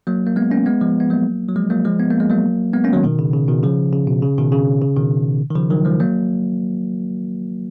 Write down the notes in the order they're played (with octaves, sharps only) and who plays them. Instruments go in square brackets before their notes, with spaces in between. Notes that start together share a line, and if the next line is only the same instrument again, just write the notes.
[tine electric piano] F#3 A#3
A#3
G#3 B3
A#3 C#4
G#3 B3
F3 G#3
B3
F#3 A#3
F#3
F3 G#3
F#3 A#3
F3 G#3
B3
A#3
G#3
F#3 A#3
G#3 B3
A#3 C#4
D#3 F#3
B2 D#3
C#3
C#3
B2 D#3
C#3 F3
C#3
B2
C#3
B2 D#3
C#3
C#3
B2 D#3
D#3
C#3 F3
D#3 F#3
F3 G#3
F#3 A#3